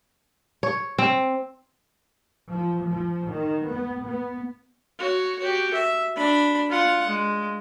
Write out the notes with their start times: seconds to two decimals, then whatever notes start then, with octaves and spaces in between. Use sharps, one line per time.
0.63 C#5
0.98 C4
2.49 F3
2.85 F3
3.32 D#3
3.70 B3
4.06 B3
4.99 F#4 C#5
5.39 F#4 G4
5.74 E5
6.16 D4 B5
6.70 F4 F#5
7.08 G#3